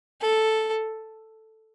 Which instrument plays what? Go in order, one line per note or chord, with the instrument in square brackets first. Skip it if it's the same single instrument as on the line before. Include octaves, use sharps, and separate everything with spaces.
[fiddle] A4